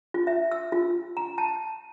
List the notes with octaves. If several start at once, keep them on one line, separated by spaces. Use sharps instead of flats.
F4
E5
E6
F4
A#5
A5